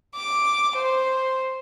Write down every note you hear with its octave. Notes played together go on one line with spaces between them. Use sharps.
D6
C5